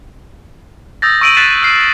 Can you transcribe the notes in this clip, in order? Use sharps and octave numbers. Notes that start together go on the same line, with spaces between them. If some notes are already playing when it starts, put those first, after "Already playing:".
D#6 E6 G6 A6 A#6
C#6 E6 D7 D#7 F#7
F#6 A6 B6 C7 D7 E7
F6 C7